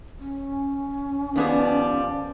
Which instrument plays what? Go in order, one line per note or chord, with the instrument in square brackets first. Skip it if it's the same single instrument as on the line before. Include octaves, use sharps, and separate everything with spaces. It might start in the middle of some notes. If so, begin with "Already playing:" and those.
[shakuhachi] C#4
[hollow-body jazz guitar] D#3 B3 G#4 [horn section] F3 G3 D5